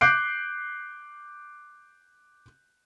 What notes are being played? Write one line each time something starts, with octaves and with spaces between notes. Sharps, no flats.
D6 F#6 G6 C7 D7